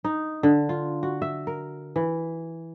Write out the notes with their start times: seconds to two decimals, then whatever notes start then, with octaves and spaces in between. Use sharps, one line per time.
0.04 D#4
0.43 D3
0.69 F4
1.03 F#4
1.22 E5
1.47 A#4
1.96 E3